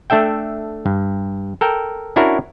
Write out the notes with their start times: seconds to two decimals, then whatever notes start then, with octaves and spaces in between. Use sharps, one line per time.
0.10 A3 D4 A4 E5 G5
0.86 G2
1.61 A4 A#4 G5
2.16 C#4 D4 E4 F#4 A#4